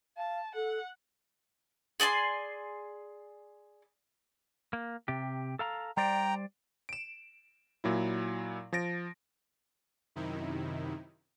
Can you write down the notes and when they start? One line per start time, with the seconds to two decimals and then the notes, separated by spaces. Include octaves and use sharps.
0.17 F5 A5
0.55 A4 F#5
2.00 G#4 D5 G#5 C6
4.73 A#3
5.08 C3 G4
5.59 A4 F5 A#5
5.97 G3 C5 D5 G5 A#5
6.89 D7 E7
7.84 A#2 F#3 E4
8.73 F3 A6 A#6 D7
10.16 F#2 C3 D#3 D#4 E4